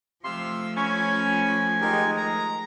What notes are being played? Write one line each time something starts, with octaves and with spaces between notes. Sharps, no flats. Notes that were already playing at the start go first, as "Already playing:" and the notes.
C3 F3 A3 E5 F5 C6 E6
C#4 G#5 B5
D#3 G#3 D#4 G4 A#4
A#5